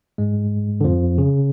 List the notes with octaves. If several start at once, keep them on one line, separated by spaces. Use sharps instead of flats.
G#2 G#3
D3
F2 F3
C#3